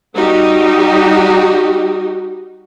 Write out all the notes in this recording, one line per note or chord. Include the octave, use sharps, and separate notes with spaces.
G3 D#4 F#4 G4